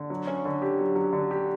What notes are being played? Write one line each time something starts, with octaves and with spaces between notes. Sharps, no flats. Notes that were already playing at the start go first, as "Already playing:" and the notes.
Already playing: D3
F#3
C#4
D3
G4
F#3
F#3
D3
G4